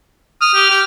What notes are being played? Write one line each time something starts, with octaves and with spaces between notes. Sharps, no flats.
D#6 F6
G4
G4